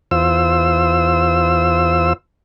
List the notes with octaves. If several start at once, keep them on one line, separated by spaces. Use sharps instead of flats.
E2 F4 C5 E6